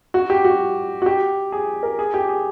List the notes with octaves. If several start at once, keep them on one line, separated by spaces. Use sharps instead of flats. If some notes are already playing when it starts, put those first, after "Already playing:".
F#4
G4
F#4
F#4
G4
G#4
A#4
G#4
G4
G#4